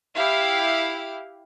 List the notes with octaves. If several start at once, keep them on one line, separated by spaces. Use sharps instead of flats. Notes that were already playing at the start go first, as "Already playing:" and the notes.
E4 G4 F5